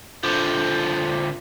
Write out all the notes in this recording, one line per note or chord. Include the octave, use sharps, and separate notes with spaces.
D3 F3